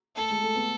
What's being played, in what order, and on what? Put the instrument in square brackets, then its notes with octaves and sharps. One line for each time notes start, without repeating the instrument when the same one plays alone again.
[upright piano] A3 [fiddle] A4
[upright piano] G#3
A3
B3